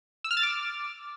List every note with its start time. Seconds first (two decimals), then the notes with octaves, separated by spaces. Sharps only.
0.24 E6
0.31 F6
0.37 A6
0.43 D6